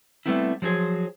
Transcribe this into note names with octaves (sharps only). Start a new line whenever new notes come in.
G3 A3 B3 C4 E4
F3 F#3 G4 G#4 C5